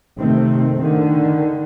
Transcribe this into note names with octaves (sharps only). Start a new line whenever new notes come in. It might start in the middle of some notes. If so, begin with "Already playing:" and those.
C3 D#3 A3 C4
D3 D#3